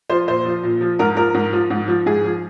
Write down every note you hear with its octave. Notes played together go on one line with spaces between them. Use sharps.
F3 C5
A#2 C5
F3
A#2
F3
G#2 A#4
F3 A#4
G#2
F3
G#2
F3
G#2 G#4
F3